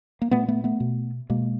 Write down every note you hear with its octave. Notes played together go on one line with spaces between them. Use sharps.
A#3
A#2 A3 B3
A3 B3
A3 B3
B2
B2 G#3 A#3